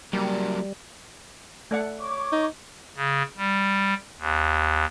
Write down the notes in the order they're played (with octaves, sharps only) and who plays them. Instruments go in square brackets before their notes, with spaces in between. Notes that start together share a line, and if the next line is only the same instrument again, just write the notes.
[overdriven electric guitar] F#3 A#3 [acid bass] G3
[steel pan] A3 D5 F#5
[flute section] C#5 C#6 D6
[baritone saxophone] D#4
[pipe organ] C#3
G3
D#2